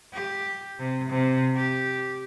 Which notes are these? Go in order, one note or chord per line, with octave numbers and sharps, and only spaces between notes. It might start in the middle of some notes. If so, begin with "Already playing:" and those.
G4
C3
C3
G4